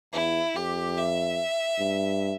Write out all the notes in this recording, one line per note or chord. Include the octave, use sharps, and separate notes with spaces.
E2 E4
F2 G4
E5
G2